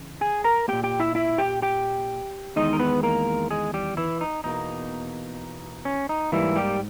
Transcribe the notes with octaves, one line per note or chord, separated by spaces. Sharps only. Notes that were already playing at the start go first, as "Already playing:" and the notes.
Already playing: C#3 E3
G#4 G#5
A#4 A#5
A#2 A#3 G4 G5
G4 G5
E4 E5
E4 E5
G4 G5
G4 G5
E2 D#3 G#3 D#4 D#5
A#4
B3 B4
A#3 A#4
G#3 G#4
G3 G4
E3 E4
D#4
E2 B2 A#3 D#4
C#4
D#4
G#2 E3 G3 A#3 E4
G3 G4